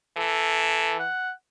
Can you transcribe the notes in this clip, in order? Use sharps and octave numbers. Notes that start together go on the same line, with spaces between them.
E3 A4
F#5